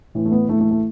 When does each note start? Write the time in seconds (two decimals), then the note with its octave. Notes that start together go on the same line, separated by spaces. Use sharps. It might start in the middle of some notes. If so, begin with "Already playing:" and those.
0.15 A2 E3
0.26 A3
0.32 B3
0.49 A2 E3 A3
0.61 A3
0.71 A3